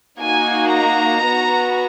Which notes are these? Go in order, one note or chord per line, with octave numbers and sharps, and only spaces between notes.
A#3 D#4 F#4 G#5
A#5
B3 F#4